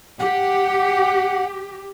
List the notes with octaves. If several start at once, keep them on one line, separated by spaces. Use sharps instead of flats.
G4 F#5